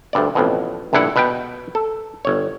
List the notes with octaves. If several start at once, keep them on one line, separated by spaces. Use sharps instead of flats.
D2 G2 D5
A1 F2 B2
A#1 G2 D3 E4 F#5
B2 B4 G5
A4
G1 C#5